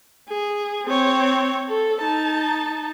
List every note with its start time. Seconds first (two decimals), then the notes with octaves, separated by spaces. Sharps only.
0.29 G#4
0.86 C4 C#5
1.68 A4
2.00 D#4 A5